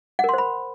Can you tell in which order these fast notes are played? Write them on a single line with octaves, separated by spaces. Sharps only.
F#5 A#4 C6 C5 B5